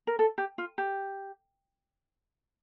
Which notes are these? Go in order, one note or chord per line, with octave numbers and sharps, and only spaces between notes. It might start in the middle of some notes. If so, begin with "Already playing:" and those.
A#4
A4
G4
F4
G4